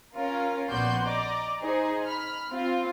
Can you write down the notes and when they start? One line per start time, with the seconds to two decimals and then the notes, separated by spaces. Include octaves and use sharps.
0.15 C#4 F4 A#4
0.70 A#1 B3 F#4 D5 C6 G6
1.06 D5 D#5 A#5 D6
1.62 D#4 G#4 C5
2.06 B5 F6
2.50 C4 F4